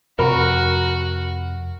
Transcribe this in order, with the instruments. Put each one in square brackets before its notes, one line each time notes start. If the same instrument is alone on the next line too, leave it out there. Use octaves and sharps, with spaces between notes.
[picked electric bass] F2 C3 [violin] F#4 F#5 [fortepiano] A#4 A#5 B5